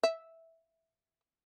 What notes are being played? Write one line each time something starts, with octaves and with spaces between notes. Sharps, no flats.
E5